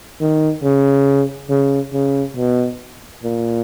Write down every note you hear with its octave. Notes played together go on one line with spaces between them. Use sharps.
D#3
C#3
C#3
C#3
B2
A#2